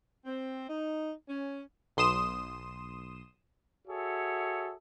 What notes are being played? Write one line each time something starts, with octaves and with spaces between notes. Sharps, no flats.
C4
D#4
C#4
B1 C6 D#6 E7
F#4 G#4 A4 C#5 E5